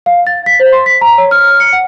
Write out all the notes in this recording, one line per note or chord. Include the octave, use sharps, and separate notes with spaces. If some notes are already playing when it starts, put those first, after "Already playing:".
F5
A6
B6
C5
C6
B6
A#5
C#5
F6
C#7
F#5